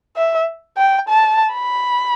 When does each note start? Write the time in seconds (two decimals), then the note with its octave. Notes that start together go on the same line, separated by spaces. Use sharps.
0.17 E5
0.78 G5
1.09 A5
1.54 B5